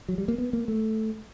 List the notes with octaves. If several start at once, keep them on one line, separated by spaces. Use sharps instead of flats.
F#3
G3
A#3
B3
A#3
A3